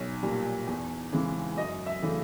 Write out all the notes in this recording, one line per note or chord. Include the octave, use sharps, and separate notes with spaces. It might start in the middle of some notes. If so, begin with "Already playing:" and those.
Already playing: B1 C#5
A#2 G3
E2
C#3 E3 G#3 C4
F#2 D#5
E5
C#3 E3 A3 D4